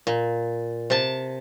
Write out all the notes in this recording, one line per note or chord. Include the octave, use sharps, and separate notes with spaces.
A#2
C3 A5